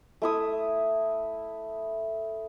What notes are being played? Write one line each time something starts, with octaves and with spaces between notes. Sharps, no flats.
A3 E4 D#6